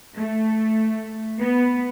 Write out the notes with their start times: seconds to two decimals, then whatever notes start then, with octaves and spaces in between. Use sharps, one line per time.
0.17 A3
1.39 B3